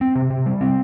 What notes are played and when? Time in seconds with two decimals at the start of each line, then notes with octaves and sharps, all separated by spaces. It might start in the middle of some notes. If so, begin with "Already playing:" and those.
0.01 C4
0.15 C3
0.30 C3
0.46 G3
0.61 C4